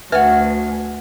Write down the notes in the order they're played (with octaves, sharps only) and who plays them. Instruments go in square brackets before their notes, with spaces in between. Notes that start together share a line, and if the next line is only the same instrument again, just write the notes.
[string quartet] D2 [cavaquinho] F#4 G#5 [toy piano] B4 E5